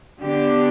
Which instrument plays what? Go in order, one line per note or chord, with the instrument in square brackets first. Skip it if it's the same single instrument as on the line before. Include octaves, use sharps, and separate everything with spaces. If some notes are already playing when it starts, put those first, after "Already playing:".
[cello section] D3 B3 D4 G4